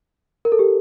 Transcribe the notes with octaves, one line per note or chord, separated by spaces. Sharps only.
A#4
A4
G4